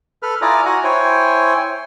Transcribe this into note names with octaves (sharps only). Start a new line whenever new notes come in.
A4 B4 F6
E4 F4 D5 G#5 A#5 D#6
F#4 F#5 G#5 A#5
E4 C5 C#5 G5 G#5